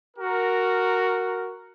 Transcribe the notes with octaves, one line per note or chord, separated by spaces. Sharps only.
F#4 A#4